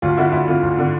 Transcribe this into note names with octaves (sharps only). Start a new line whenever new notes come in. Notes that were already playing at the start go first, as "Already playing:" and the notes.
D2 F4
D3 E4 F#4
D2 E4
D3 F4
D2
D3